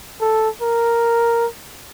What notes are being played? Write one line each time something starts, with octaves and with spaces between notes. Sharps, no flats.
A4
A#4